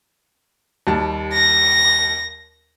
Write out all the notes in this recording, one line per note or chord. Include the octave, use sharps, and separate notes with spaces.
D#2 G3 A5
A#6